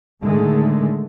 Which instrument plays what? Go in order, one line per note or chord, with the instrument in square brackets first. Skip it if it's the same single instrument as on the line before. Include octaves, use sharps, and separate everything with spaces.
[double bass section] A2 D3 D#3 G#3 A3